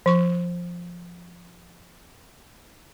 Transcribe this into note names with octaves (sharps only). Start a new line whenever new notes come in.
F3 C#6